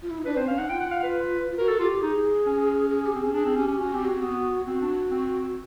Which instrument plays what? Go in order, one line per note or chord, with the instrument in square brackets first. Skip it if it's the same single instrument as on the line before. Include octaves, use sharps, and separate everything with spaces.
[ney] F4
E4
D#4
[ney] D4 [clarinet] B4
[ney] C4 [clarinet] C5
[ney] C#4 [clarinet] F5
[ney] D#4 [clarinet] F#5
[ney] F4 [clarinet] G5
[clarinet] F#5
F5
B4
[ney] F4
[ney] F#4 [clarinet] A#4
[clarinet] A4
[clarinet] F4 [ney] G4
[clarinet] D#4 [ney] G#4
[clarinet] C#4
[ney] G#4
G4
[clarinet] C4 [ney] G#4
[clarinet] C#4
[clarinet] D4 [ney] G#4
[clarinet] C4
[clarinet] C#4 [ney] G4
[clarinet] C#4
[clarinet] C#4 [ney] F#4
[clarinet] C4 [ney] G4
[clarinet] C4 [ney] F#4
[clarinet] B3
[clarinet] C4 [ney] F#4
[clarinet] D4
C4